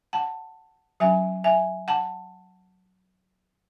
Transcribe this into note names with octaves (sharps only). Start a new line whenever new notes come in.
F#5 A5
F#3 C#4 E5 G#5
E5 G#5
F#5 A5